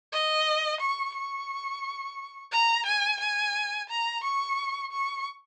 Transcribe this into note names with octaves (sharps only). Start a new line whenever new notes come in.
D#5
C#6
C#6
A#5
G#5
G#5
A#5
C#6
C#6